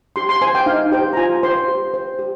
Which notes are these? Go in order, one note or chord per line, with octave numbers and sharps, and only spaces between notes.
G4 C6
C6
C5 G#5
G5
D#4 F5
G4 C5 G5
A#5
F4 G#5
C5 C6
G4
C5
G4